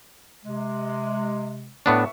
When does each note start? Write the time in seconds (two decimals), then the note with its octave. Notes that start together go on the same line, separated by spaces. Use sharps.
0.45 C3 G#3
1.86 A2 B3 D4 E5 C#6